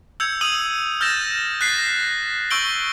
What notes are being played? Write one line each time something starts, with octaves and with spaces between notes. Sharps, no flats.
E6 G6 G#6 C#7 F7
D#6 E6 D#7 F#7
E6 F6 G6 A6 A#6 E7
F#6 A6 B6 C7
A#6
C#6 E6 G6 D7 F#7 G7